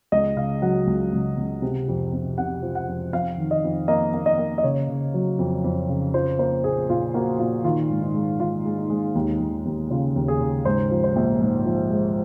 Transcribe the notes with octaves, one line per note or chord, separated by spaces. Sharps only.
C#2 D#5
C#3 F5
F#3 F#5
C#2
C#2
C#2
C3
F2
C3
C3 F#5
F3
F#5
F2
F2 F5
D#3
D#5
F2
A#3 D#5
A#3
D#5
A#3
D#5
C#3 C#5
C#3
F#3
F2
F2
C#3
F3 C5
A#3 C5
A#1 G#4
A#2 F4
A#3 F#4
A#2 F4
D#3 F4
G#2
D#4
G#3
D#3 F4
G#3
D#4
G#3
D#2 D#4
D#2
D#2
C#3 F4
D#2
G#4
C#3
G#2 C5
F3
C5
A#1
G#2
F3
G#3